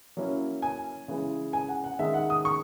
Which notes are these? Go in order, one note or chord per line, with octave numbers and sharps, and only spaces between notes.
F#3 A#3 C#4 E4
G#5
C#3 E3 G#3
G#5
F#5
F#5
D#3 G#3 D#4 E5
F#5
D#6
C#6